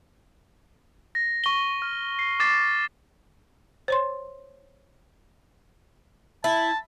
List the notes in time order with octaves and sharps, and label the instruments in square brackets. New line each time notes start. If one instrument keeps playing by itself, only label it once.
[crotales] A#6
C#6 G7
F6
C7
D6 A6 C7
[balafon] C5 C#5 C6
[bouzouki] E4 [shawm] A5